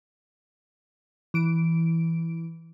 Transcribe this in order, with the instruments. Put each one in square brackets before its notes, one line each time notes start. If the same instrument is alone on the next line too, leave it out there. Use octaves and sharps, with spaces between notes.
[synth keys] E3 D7